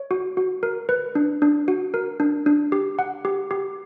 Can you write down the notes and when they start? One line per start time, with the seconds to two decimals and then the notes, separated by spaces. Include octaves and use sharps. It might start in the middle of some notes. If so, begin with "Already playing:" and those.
Already playing: C#5
0.11 F#4
0.37 F#4
0.63 A#4
0.89 B4
1.15 D4
1.42 D4
1.68 F#4
1.94 A#4
2.20 D4
2.46 D4
2.72 G4
2.99 F#5
3.25 G4
3.51 G4